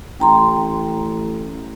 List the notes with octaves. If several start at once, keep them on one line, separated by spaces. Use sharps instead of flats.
A1 G5 A#5 C6